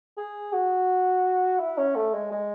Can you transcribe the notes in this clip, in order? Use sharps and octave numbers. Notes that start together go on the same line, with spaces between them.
G#4
F#4
E4
C#4
A3
G#3
G#3